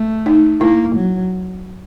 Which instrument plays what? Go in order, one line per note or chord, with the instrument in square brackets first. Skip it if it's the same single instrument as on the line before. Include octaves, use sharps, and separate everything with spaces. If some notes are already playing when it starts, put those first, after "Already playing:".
Already playing: [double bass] A3
[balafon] D#4
[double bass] A#3 [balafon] E4
[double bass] F#3